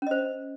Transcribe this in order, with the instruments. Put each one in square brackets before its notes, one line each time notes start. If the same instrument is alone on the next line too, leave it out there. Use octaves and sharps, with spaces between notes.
[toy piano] C#4
D#5
C5